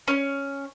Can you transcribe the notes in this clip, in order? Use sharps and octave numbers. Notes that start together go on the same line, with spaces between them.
C#4